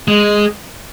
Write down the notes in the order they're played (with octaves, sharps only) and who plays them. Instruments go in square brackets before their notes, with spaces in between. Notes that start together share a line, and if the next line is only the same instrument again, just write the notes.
[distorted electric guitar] G#3